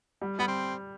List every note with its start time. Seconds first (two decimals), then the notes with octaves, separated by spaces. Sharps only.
0.21 G3
0.39 G3 B3
0.47 C4